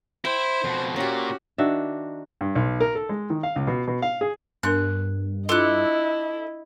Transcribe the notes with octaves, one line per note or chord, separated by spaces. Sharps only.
E4 C5 G5
F2 B2
A#2 C#4 F#4 G4
D#3 D4 F#4 E5
G2
B1
A#4
A4
G#3
D#3
F5
C#2
B2
B2
F5
G#4
G2 B3 D4 A#4 F#6
D4 E4 F4 A4 D#5 D6 F#6